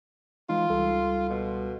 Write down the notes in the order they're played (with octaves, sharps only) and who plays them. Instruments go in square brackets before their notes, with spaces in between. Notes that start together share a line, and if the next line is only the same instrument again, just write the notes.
[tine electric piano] E3 G#3 D#4 [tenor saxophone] F4
[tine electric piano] C#2 G3 A4
[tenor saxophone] B2